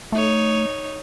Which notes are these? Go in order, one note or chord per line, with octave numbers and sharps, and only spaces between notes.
A3 D#4 C#5